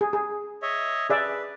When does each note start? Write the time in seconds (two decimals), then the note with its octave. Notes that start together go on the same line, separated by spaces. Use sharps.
0.01 G#4
0.13 G#4
0.62 C#5 D#5 E5
1.10 G#4 B4 D5 E5